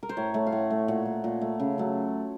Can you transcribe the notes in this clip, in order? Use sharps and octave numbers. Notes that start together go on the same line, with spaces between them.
A#4
C5
A2 C#5
A3
F5
A2 F#5
A3
A#2 F#5
A3
A#2
A3
C#3
F#3 A3